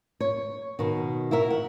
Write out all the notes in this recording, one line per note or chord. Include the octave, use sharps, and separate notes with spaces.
C#5
B2 D#3
E4 F#4 A#4 E5
F#5